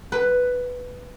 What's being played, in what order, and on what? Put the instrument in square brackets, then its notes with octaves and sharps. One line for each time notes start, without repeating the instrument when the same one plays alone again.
[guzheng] B4